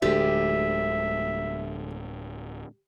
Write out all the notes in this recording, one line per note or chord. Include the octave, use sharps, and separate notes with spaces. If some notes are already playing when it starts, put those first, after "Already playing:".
D1 D2 G#3 G4 E5